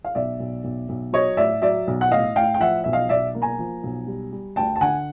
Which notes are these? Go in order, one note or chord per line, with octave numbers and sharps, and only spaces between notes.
F5
B1 D5 E5
B1
B1
B1
F#3 C#5 D#5
A2 D5 E5
F#3 D5 E5
B1
F#5
A2 D#5 F5
A2 F5 G5
G5
F3 E5 F#5
B1 E5
D#5 F5
B1 D5 E5
A#3
G#5 A#5
F3
B1
G3
G3
D2 G5 A5
A5
D3 F#5 G#5